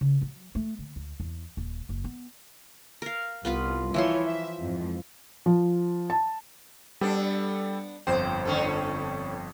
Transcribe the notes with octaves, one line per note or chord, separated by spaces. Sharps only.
C#3
F#3
A3
D3
D2
E2
D#1
F#1
B3
A#4 F5
C2 B3 F4 B4
E3 F3 E4 C#5 C6
E5
F2 G#2
F3
A5
G3 B3 D4 A4
G1 F2 C5 G5
D3 C#4 A4